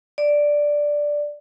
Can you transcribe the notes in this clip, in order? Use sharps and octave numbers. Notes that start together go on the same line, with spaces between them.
D5